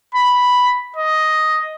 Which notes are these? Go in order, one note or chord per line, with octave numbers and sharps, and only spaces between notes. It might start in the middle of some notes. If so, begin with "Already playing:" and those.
B5
D#5